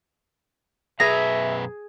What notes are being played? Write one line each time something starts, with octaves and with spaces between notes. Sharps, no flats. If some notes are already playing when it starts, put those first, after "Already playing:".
F#2 B2 G#4 B4 E5 A#5